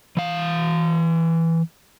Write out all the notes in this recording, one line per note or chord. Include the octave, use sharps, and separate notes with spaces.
E3 F5